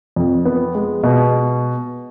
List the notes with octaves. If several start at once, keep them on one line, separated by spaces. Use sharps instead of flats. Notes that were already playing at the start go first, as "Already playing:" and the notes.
F2
B3
G#3
B2